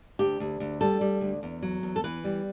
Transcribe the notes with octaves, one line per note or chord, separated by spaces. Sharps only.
D2 G4
D2
D2
G3 A4
G3
D2
E2
F#3
E2
A4
E3 B4
G3